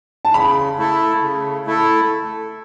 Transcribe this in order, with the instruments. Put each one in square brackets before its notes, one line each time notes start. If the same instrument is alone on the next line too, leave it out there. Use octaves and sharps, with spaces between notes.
[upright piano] A5
[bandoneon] C#3 [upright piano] B5
[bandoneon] A3 E4 A4
C#3
A3 E4 A4